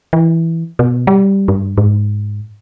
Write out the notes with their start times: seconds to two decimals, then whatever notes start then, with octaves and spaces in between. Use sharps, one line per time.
0.13 E3
0.79 B2
1.07 G3
1.48 G2
1.78 G#2